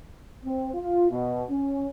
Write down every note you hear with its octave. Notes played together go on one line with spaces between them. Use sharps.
C4
F4
B2
C#4